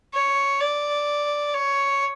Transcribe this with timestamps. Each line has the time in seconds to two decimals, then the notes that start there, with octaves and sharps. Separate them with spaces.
0.14 C#5
0.61 D5
1.54 C#5